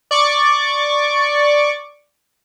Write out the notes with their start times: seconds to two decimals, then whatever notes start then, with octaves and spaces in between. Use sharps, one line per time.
0.11 D5 C#6 D6